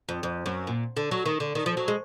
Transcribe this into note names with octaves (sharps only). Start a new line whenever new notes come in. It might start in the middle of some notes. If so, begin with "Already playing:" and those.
F2
F2
F#2
A#2
D3
F#3
D#3
D3
D#3
F3
F#3
G#3